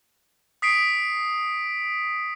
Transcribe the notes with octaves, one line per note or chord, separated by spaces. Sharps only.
D#6 B6 C7 D7